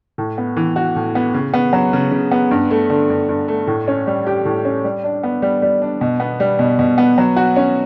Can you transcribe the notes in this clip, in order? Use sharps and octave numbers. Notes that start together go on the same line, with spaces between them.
A2
B3
E3
F#4
A2
B3
C#3
B3
F#3
C#3
C#3
B3
G2
A3
D3
G2
G2
A3
A2
C#4
G3
G4
A2
C#4
G3
D4
B3
G3
G3
D4
B2
B3
G3
B2
B2
B3
F#3
F#4
C#4